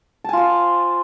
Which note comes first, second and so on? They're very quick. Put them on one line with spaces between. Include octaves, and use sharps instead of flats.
A5 G#5 F4 C5